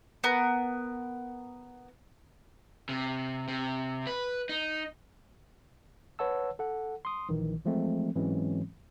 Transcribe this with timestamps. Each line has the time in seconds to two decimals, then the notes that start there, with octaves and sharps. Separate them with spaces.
0.24 B3 A#4
2.89 C3
3.48 C3
4.07 B4
4.49 D#4
6.19 B4 C#5 F#5 A5 E6
6.59 A4 F#5
7.05 C6 D#6
7.29 A#1 D#3 E3
7.65 E3 F3 G#3 A3 C4
8.15 G#2 E3 F#3 G#3 C4 C#4